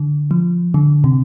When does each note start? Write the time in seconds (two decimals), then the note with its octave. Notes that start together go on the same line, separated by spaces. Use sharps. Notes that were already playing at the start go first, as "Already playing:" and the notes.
Already playing: D3
0.31 F3
0.74 D3
1.04 C3